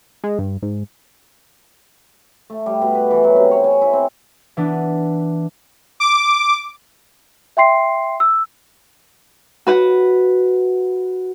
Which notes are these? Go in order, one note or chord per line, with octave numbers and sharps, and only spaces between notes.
G#3
G2
G#2
A3
G3
B2
B4
E3
F#3
C3
C#5
G#5
E4
C4
E3 B3 D4
D6
E5 G5 C6 C7
E6
F#4 B4 F#5